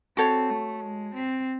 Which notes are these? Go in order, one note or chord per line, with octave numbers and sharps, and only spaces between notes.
C4 F#4 A4 C#5
A3
G#3
C4